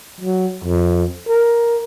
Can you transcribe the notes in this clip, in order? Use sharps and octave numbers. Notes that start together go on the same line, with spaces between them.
F#3
F2
A#4